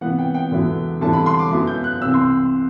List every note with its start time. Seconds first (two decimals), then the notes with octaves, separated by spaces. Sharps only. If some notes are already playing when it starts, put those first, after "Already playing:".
0.01 C3 E3 B3 F#5
0.19 G5
0.34 G5
0.51 E2 D3 F#3 B3 E4
1.01 E2 D3 G3 C4 E4 A5
1.13 B5
1.26 C6
1.39 D6
1.51 F#2 F#3 B3 E4
1.67 G6
1.84 F#6
2.02 C2 C3 E3 E6
2.14 C6